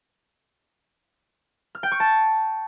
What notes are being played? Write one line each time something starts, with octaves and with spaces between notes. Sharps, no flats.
F6
G5
C#6
A5